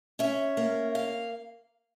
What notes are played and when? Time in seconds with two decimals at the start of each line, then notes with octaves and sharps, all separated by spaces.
0.19 C#4 E5
0.57 A#3
0.95 F5